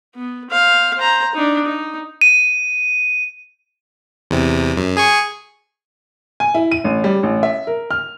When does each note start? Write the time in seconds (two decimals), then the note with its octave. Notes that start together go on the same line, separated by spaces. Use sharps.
0.15 B3
0.51 C5 F5
0.97 C5 A#5
1.35 D4 D#4
1.65 D#4
2.21 D#7
4.31 E2 C3
4.77 F#2
4.97 G#4 G#5 C#6
6.40 G#5
6.54 E4
6.71 D#7
6.84 A1
7.04 G3
7.23 A1
7.43 E5
7.67 A#4
7.91 F6